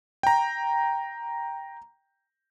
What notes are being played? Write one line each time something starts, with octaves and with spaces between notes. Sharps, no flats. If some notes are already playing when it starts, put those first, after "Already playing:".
G5 A#5